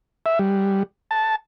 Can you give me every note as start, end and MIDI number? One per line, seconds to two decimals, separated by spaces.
0.26 0.39 76
0.39 0.83 55
1.11 1.35 81